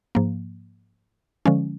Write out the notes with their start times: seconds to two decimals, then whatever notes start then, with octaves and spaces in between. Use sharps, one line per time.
0.15 G#2 F3 A#3
1.46 D3 F3 G#3 C#4